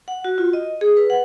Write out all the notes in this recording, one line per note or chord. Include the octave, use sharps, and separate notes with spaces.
F#5
F#4
F4
D#5
G#4
B4
F#5